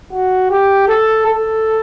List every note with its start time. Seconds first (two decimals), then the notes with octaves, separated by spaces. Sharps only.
0.12 F#4
0.50 G4
0.87 A4
1.26 A4